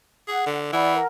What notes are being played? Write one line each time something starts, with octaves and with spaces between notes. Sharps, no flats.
G#4 F#5
D3
E3 D5 F#5 B5
A#4